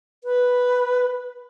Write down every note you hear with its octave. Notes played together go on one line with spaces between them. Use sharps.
B4